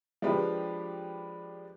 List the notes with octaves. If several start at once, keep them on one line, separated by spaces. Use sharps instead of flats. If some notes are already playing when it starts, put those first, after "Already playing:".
F3 G#3 D4 G4 B4